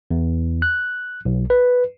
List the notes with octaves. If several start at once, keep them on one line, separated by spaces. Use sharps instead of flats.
E2
F#6
B1
B4